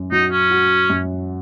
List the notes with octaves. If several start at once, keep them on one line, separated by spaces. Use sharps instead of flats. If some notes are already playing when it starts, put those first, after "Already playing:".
Already playing: F#2 C#4
F#3 D#4
C#4
F#4
F#2